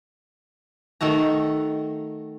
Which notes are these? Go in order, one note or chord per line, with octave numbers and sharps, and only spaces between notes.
D#3 A3 F#4 A#5